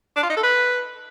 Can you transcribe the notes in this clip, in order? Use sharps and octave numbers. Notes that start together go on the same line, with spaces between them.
D4
F4
D#4
A4
B4